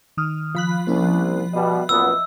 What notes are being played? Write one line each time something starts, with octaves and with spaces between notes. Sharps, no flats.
D#3 D#6 F6
F3 B5 F#6
C2 A#3 C#4 E4
B2 G3 D#5 E5
F#2 A#2 B3 E6